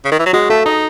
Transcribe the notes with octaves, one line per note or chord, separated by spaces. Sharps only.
C#3
D#3
E3
F#3
G#3 F#4
A3 A4
D#4 D#5